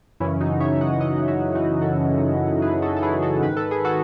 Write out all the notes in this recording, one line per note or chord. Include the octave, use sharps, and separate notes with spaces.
F#2 C#3 E3 C#4 E4
D#4 F#4
C#5 E5
D#5 F#5
D#5 F#5
C#5 E5
D#4 F#4
F#4 A4
G#4 B4
F#4 A4
A4
E4 G#4
F#4 A4
G#2 D#3 B4
A4
G#4
F#4 A4